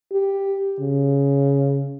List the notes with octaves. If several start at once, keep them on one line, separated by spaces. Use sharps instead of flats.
G4
C#3